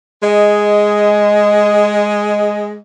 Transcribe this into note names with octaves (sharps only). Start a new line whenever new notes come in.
G#3 D#5